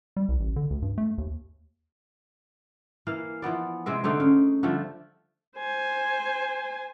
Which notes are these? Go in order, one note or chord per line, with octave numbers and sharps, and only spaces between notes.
G3
C2
A1
D3
D2
G2
A3
D#2
E3 A#3 F5
E3 F3 B3 D5
C3 G#3 C4 E5
D3 A3 C4 D#4
C#3
D3 F3 G3 A3
C5 G#5